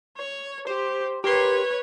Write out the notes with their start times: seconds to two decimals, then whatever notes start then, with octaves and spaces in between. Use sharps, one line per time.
0.17 C#5
0.67 G4 C5
1.24 G4 A#4 B4 C#5 C6